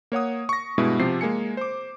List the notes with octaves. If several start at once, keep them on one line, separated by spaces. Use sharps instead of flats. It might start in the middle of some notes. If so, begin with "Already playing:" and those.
A#3 C#5 F#5 D#6
C#6 A#6
G2 B2 G#3 E4
C3 F3 G4 C7
G#3 A#3 G#5 C#7
C5 D6